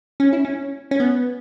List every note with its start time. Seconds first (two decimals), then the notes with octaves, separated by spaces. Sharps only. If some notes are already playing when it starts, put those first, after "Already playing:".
0.20 C#4
0.33 E4
0.45 C#4
0.91 C#4
1.00 B3